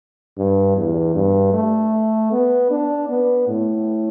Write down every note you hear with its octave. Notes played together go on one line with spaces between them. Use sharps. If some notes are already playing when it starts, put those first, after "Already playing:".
G2
E2
G2
A3
B3
D4
B3
A2